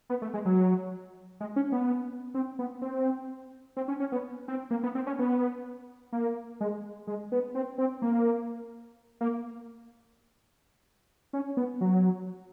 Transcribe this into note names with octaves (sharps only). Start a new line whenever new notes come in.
B3
A3
G#3
F#3
G#3
C#4
B3
C4
B3
C4
C4
C#4
C#4
B3
C4
A#3
B3
C4
C#4
B3
A#3
G#3
G#3
B3
C4
C4
A#3
A#3
C#4
B3
F#3